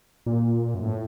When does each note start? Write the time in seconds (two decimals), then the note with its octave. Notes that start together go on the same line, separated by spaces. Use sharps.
0.26 A#2
0.75 F#2
0.83 A2